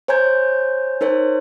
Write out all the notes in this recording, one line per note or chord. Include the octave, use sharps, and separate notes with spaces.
C5 C#5 G#5 A#5 G6 G#6
D#4 A#4 C5 C#5